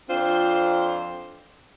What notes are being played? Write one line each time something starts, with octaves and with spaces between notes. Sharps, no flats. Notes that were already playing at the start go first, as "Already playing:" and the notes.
F2 C4 D4 F4 C5